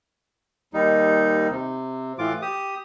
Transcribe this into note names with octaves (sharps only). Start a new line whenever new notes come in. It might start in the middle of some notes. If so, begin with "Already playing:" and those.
D#2 G3 D#4
C3
A2 E3 F4 D6
G4 D#6